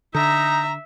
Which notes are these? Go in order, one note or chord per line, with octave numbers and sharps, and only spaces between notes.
D3 D#4 E5 A#5